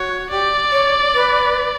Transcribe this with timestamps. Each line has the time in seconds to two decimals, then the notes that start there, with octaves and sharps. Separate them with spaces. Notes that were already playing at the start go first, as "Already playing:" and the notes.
Already playing: F#4 C#5
0.30 G4 D5
0.72 C#5
1.15 B4